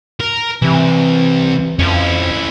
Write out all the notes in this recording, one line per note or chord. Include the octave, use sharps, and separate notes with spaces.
A#4
C2 C3 E3
F2 C#4 E4